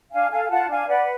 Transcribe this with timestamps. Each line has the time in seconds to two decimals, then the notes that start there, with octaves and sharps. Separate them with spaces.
0.12 D4 F5 G#5
0.31 A4 F5 G#5
0.44 G#5
0.50 F4 F#5 A5
0.69 D4 F5 G#5
0.88 B4 D5 F#5